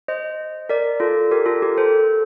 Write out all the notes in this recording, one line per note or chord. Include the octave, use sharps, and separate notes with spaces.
C5 D#5
A#4 D5
F4 A4
G4 A#4
F4 A4
G4 A#4
A4 C5